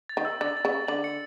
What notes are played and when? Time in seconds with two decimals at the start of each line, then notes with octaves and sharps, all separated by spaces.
0.09 A6
0.17 D#3
0.25 E6
0.41 D3 A6
0.57 A6
0.65 C#3
0.73 A6
0.88 D3 F#7
1.04 C#7